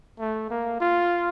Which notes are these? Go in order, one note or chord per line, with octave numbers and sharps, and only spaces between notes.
A3
A#3
F4